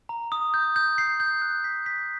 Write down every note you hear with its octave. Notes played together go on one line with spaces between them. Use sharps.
A#5
D#6
G6
G6
C7
G6
F#6
B6
B6